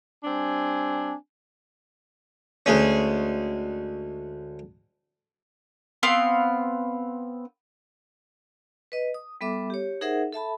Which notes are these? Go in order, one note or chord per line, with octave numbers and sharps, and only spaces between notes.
G3 C4 D4 G#5
D2 G#3 C#4
B3 C4 F5
B4 D#5
D#6
G3 B3 A4 E5 D6
G4 C#5
D#4 G#4 A#4 C5 E5 F#5
A4 E5 A5 B5